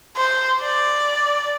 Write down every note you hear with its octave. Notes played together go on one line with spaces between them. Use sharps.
C5
D5